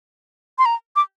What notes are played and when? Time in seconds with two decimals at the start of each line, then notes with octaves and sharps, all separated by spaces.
0.58 C6
0.66 A#5
0.96 D6